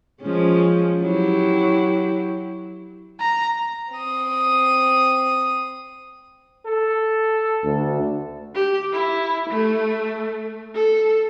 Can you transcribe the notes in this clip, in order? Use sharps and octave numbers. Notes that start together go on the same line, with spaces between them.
F3 G#3 C#4
F#3 E4 G4
A#5
C4 D#6
A4
D2
G4
E4
A3
A4